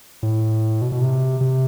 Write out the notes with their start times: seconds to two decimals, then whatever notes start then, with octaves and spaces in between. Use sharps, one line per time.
0.23 A2
0.82 B2
0.92 B2
1.02 C3
1.41 C3